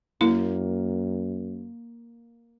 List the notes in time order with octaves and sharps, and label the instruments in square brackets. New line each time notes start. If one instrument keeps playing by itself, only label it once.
[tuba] F#2 [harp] A#3 [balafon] E4